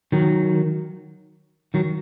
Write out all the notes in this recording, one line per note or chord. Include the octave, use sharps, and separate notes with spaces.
D#3 F#3
D#3 F#3